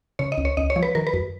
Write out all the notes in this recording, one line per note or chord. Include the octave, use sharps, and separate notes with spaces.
C#3 C#5
D#5
C#2
C#5
C#2 D#5
C#5
F3
B4
D#3 A#4
B4
F#2